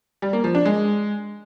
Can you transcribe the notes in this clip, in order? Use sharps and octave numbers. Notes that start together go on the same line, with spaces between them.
G3
A#3
F3
D4
G#3